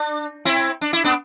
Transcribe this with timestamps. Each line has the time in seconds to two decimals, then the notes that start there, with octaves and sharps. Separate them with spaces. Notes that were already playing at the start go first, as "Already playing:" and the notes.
Already playing: D4
0.45 C4 E4
0.81 D4
0.93 E4
1.04 B3 D4